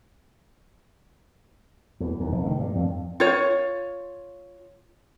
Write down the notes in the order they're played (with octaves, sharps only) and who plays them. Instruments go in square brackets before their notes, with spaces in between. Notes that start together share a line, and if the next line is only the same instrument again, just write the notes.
[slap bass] E2
D#2
F1
D#3
G2
F2
[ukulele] F4 C#5